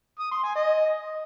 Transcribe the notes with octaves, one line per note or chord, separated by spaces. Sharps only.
D#6
C6
G#5
D#5